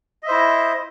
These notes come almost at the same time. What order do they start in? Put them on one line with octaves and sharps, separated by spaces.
D#5 E5 C5 E4